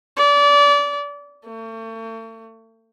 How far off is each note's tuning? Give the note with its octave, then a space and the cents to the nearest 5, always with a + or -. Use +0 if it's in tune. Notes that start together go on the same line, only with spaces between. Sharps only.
D5 -30
A3 +40